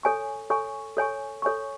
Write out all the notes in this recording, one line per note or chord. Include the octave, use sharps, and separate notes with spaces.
A4 C#5 G#5 C#6
A4 C#5 G#5 C#6
A4 C#5 G#5 C#6
A4 C#5 G#5 C#6